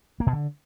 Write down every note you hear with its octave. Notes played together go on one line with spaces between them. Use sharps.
A#3
B2
D3